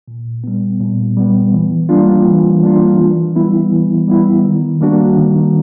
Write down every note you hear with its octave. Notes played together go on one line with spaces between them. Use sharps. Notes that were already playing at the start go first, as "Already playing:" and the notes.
A#2
G3 B3
A#2
G3 B3
E3
G3 A#3 D4 F4
E3
G3 A#3 D4 F4
E3
G3 B3 E4
E3
G3 B3 E4
D#3
G3 A#3 D4 F#4
D#3